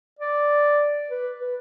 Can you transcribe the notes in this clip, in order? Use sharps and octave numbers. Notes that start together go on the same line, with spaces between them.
D5
B4
B4